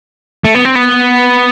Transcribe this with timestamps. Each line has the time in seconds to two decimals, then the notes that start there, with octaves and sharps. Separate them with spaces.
0.45 A3
0.55 B3
0.65 C4
0.75 B3